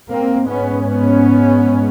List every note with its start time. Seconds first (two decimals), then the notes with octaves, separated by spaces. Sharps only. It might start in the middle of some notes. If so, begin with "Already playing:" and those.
0.10 G#2 A#3 C4
0.48 B3 C#4
0.87 B3 C#4